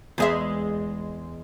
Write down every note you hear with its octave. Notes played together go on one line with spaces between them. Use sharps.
E2 G#3 E5